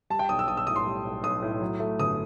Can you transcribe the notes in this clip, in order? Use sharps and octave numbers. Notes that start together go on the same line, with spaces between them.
G3 A5
G5
B1 D#6
E6
B1 D#6
E6
A2 D#6
C6
G3
B1
B1 D#6
A2
F#3
A3
G1 D#6